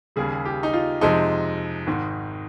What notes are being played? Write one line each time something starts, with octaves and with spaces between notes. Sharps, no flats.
D#2 C#3 G3 G#4
G4
D#4
F4
F2 C3 F3 G#3 D#4
G#1 G#2 D#3